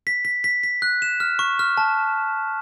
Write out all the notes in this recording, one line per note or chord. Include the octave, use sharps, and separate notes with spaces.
B6
B6
B6
B6
F#6
E7
F6
C#6
F6
A5